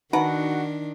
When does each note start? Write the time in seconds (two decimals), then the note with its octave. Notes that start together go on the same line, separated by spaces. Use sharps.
0.13 D#3 D4 D#4 F#4 A#4 B4 F#5